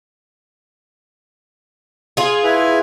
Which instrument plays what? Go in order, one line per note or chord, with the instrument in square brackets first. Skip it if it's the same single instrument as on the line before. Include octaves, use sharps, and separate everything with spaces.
[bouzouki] F4 G#4
[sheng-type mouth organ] E4 B4 G#5